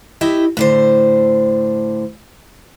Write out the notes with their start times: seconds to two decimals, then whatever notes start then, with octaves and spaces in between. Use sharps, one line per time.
0.21 E4 G4 D#5 E5
0.57 A2 D3 C5